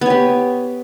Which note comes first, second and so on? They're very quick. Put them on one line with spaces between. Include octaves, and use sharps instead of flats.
B3 C#5 G4